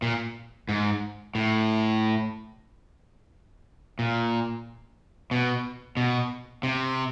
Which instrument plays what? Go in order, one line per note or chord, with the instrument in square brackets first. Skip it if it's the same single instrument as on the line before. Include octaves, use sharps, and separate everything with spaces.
[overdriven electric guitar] A#2
G#2
A2
A#2
B2
B2
C3